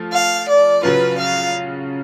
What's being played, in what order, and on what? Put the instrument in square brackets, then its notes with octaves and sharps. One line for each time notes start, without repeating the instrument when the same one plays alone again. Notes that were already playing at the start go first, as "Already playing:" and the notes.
Already playing: [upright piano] F3 A3 F4
[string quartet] F5
D5
[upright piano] C#3 F#3 C#4 F4 [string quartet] B4
[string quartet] F5